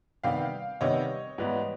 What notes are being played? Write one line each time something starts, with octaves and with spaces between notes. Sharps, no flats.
C3 D#3 G3 B3 F5 G5
C3 D#3 G3 B3 C#5 D#5
G#2 E3 G3 B3